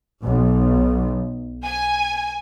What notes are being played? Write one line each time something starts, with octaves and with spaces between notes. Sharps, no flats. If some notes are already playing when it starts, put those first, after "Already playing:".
B1
G#5